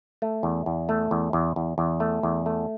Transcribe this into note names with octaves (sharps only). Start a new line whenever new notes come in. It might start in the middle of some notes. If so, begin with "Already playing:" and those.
A3
E2
E2
A3
E2
E2
E2
E2
A3
E2
A3